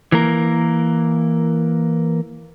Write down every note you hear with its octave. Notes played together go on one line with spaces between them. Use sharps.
E3 A#3 A#4